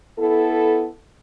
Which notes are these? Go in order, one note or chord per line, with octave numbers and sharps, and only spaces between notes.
B3 E4 A4